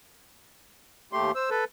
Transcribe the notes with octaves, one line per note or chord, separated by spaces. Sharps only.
D#2 A3 G4 C6
C5 E6
A4 B4